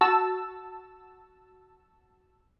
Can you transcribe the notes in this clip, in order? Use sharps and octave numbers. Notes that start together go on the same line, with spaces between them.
F#4 A5 E6